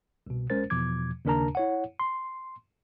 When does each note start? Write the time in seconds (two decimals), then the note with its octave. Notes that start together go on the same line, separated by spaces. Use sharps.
0.27 C2 B2
0.50 B1 G#3 C#4 A#4 C5 A6
0.70 E2 B2 F3 D6 G#6
1.25 D#2 C#3 D4 A#4 A5 A#5
1.55 E4 C#5 F#5
2.00 C6